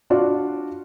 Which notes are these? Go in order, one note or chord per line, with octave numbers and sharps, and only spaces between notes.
D4 F4 F#4 D5